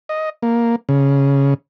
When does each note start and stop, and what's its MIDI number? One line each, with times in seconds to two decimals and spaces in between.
0.09 0.29 75
0.43 0.76 58
0.89 1.54 49